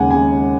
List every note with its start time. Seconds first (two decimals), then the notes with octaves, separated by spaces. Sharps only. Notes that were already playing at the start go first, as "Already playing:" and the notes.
Already playing: D#2 C#3 G#3 F#5 G#5
0.11 C#3 G#3 G#5